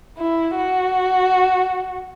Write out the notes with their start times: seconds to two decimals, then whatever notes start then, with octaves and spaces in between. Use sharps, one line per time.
0.18 E4
0.56 F#4